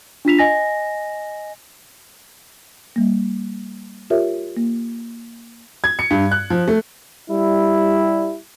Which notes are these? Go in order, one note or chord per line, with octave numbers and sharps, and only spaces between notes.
D4 F4 B6 F7
D#5 G#5 A#6
G3 A#3
F4 G4 A#4 C#5 E5
A#3
G#6
C#7
G2
F#6
F3
A3
G3 E4